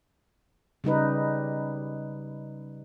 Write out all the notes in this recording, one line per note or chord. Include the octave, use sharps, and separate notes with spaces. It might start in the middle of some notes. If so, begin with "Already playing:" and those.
C#3 G3 D#4 B4